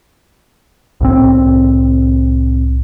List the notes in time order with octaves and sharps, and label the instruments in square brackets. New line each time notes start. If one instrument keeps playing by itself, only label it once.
[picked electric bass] C2 A2 C4